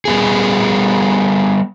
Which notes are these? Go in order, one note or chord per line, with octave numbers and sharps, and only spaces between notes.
G3 B3 G#4